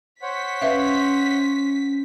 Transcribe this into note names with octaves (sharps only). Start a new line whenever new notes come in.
C5 C#5 F#5 B6
C#4 B4 E5 F5